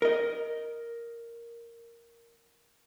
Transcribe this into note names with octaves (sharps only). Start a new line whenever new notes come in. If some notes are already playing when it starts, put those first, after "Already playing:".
A#4 D#5